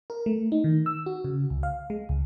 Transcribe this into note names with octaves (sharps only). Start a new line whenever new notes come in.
A#4
A3
D#4
D#3
E6
F#4
C#3
C#2
F5
G#3
C#2